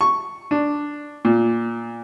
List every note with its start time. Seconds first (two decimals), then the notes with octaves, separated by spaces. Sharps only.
0.01 C#6
0.51 D4
1.25 A#2